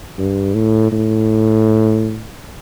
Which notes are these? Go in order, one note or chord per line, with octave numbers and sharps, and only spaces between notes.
G2
A2
A2